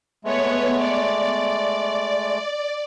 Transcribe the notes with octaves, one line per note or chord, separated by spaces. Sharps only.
G#3 A3 B3 C#5
D5